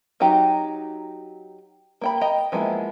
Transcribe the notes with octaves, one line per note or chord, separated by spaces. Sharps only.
F#3 D#4 F#4 G4 A#5
A#3 G5 B5
D#5 G5 A#5
F3 G#3 A#3 B3 E4